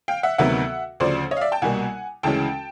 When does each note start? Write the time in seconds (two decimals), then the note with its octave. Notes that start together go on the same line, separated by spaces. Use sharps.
0.08 F5 G5
0.23 E5 F#5
0.38 D2 C3 D#3 F#3 B3 E5 F#5
1.00 D2 C#3 F3 C5 D5
1.31 C#5 D#5
1.37 F5
1.41 D5 E5
1.52 G5 A5
1.62 C2 B2 G3 A#3 F#5 G#5
2.23 D2 C#3 E3 G#3 C#4 G5 A5